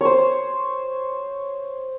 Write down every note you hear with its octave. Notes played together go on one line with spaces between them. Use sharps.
C5 C#5